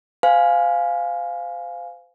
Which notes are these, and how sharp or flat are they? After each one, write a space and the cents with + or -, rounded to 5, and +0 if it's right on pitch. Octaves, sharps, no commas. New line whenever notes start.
C5 -35 F5 +0 G#5 +0